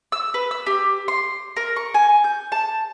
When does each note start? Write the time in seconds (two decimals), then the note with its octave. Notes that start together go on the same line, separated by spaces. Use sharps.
0.12 E6
0.34 B4
0.51 E6
0.67 G4
1.08 C6
1.56 A#4
1.76 C#6
1.94 G#5
2.24 G6
2.52 A5